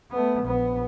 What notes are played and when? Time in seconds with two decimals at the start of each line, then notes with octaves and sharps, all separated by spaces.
0.11 A3 B3
0.43 A#1 B3